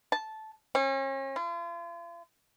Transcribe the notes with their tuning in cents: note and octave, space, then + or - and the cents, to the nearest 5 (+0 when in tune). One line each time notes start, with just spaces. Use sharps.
A5 -10
C#4 -40
F4 -40